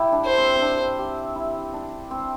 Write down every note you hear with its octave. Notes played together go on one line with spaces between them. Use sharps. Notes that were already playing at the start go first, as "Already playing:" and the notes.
Already playing: E4 G4
D4
C5
C4
C4
D4
G4
E4
D4
C4